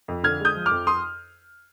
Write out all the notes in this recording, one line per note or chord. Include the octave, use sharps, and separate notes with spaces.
F2
D3 F6 G#6
G#3 D#6 G6
F3
D6 F6
F2
C6 D#6